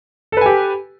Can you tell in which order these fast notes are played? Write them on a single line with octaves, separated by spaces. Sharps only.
A4 B4 G#5 G4